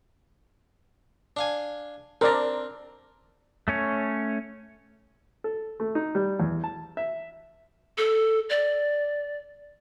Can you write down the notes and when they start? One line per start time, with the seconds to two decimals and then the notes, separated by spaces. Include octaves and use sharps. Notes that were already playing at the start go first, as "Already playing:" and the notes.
1.37 D4 F5 G#5
2.21 C4 D4 A#4 D5 A#5
3.68 A3 C#4 C#5
5.44 A4
5.80 A3
5.95 D#4
6.15 G3
6.40 E2
6.64 A5
6.97 E5
7.98 A4
8.50 D5